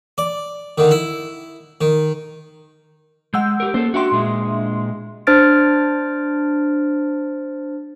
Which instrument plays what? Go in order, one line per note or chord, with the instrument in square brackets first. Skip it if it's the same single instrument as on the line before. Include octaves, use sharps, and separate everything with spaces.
[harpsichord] D5
D3 D#3
E4
D#3
[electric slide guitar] G#3 [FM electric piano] F#5 E6 G6
[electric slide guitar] G4 A#4
[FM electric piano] A#3 C#4 [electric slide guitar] A4 C5
[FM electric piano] D4 E5 C6 [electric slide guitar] F#4 G5
[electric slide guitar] A#2 G#3
[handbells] D4 C5 F6 A6 D7